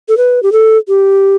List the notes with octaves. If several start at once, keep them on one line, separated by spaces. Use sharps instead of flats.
A4
B4
G4
A4
G4